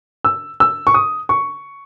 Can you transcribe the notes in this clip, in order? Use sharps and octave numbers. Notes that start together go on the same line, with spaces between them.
E6
E6
C#6
D#6
C#6